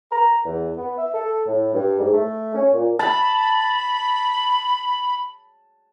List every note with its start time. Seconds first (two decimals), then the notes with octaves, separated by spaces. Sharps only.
0.12 A#5
0.45 E2
0.77 B3
0.98 E5
1.14 A4
1.47 A2
1.74 G2
1.99 G#2
2.13 A3
2.55 C#4
2.73 A#2
2.99 A5 B5